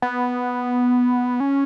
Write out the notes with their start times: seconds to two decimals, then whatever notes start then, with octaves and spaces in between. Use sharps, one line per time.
0.02 B3
1.40 C#4